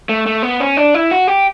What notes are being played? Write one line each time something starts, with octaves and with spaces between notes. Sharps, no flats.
A3
A3
B3
C#4
D4
E4
F#4
G4